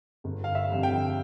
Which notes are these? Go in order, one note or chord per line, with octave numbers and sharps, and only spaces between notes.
G1
F5
E5
F2 D3 G3
G5